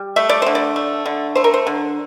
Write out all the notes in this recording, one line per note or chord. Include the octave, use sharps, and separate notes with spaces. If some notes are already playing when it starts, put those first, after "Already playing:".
Already playing: G3
A3 E5
D5
D3 C5
D5
A3
D3
A3 C5
A#4
C5
D3